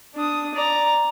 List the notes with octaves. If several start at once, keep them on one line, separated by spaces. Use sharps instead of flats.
D4 D#6
D5 A#5